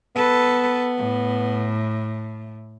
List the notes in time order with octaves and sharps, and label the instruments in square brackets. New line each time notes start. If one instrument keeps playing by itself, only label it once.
[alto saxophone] B3 [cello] A4 B4
[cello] A2